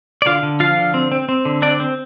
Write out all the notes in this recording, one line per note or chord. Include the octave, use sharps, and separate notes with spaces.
D5
D3 F4 F5
D3
F3 F4 F5
D3
C4
C4
C4
D3
C4 D4 D5
C4